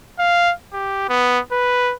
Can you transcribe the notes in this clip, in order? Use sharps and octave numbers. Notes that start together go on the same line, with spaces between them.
F5
G4
B3
B4